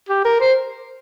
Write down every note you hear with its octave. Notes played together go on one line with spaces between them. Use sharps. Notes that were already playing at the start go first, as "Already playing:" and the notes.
G4
A#4
C5